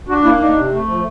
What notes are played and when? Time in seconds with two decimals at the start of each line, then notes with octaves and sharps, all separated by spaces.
0.09 D4 F#4
0.24 A#3 E4
0.40 D4 D#4
0.56 C3
0.72 A3
0.88 F3